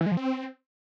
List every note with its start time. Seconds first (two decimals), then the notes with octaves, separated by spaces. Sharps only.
0.01 E3
0.06 G#3
0.12 F3
0.17 C4